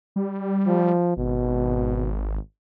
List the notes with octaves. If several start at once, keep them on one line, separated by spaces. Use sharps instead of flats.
G3
F3
G#1 B2